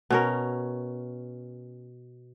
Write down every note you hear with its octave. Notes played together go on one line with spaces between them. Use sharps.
B2 C#4 A#4